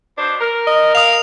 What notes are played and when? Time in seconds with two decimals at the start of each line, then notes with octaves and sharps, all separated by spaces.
0.18 B2 D4 C5
0.41 A#4
0.67 D#5
0.95 F5 D#6 F7